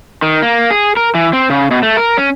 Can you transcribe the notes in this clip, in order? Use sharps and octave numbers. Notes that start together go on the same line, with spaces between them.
D#3
A#3
G#4
A#4
E3
C4
C#3
B2
A3
A#4
C#4